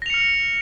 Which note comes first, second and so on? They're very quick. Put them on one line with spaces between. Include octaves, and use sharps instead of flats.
A#6 F7 C#7 F6